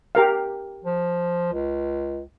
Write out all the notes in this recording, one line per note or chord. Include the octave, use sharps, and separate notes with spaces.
G4 A#4 F5
F3
C#2